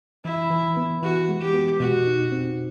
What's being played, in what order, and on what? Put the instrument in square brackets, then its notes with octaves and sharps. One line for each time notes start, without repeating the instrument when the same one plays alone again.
[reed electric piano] E3 [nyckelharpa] E4
[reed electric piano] E3
B3
[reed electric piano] E3 [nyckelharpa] F#4
[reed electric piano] G#3
[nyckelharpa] G4
[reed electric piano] B3
[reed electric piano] B2 [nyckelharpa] F#4
[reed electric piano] D#4
C4